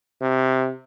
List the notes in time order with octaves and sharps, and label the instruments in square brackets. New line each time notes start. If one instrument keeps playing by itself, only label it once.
[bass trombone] C3